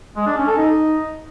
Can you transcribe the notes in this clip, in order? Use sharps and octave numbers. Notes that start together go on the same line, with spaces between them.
G#3
D4
C#4
A4
D#4